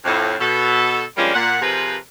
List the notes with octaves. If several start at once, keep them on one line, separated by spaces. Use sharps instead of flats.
F2 A2
B2 A4
F3 G3 G#3 A#3 C#4 D4
A#2 F#5
C3 F3 G#4 A#4 B4